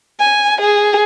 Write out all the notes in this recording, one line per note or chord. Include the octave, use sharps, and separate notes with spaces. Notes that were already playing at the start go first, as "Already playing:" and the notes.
G#5
G#4